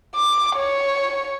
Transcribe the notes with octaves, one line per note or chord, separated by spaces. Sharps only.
D6
C#5